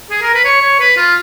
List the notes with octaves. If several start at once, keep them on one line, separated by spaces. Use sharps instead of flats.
G#4
A#4
B4
C#5
C#5
B4
F4